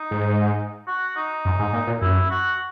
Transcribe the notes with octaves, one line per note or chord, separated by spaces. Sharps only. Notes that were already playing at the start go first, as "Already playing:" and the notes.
Already playing: D#4
G#2
F#4
D#4
F#2
G#2
A#2
A#2
F#2 E4
F#4